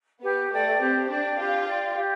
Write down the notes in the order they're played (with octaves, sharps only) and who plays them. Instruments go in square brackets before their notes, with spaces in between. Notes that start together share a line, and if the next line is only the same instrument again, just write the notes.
[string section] B3 [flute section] G4
[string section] A3 [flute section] D5 G5
[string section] C4 [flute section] G4
[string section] D4 [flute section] D5 G5
[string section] F4 [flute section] G4
[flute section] D5 G5
G4